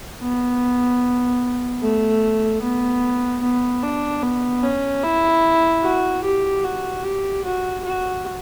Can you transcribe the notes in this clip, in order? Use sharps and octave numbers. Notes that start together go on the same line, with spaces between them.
B3
A3
B3
B3
D4
B3
C#4
E4
F#4
G4
F#4
G4
F#4
F#4